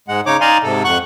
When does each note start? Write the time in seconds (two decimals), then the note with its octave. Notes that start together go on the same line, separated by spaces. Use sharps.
0.08 G#2 G#3 F#5
0.26 C#3 D#4 C#5 D6
0.41 D#4 D5 F5 G#5 A#5 C6
0.63 G#2 C3 A4
0.84 F2 F#5 C#6 F#6